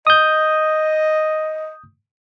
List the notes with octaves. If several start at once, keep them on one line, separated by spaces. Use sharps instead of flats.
D#5 D#6 G6